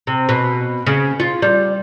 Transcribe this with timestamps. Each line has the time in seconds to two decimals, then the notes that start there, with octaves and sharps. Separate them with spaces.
0.07 C3
0.29 B2
0.86 C#3
1.20 F4
1.42 G3